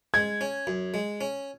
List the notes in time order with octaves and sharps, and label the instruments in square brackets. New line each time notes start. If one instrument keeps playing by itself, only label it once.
[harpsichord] G#3 [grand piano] G#6
[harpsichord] C#4
F#2
G#3
C#4